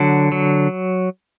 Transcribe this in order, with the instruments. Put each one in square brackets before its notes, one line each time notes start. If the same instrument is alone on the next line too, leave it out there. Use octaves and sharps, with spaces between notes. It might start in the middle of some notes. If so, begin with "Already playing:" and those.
Already playing: [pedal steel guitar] D3 F#3
F#3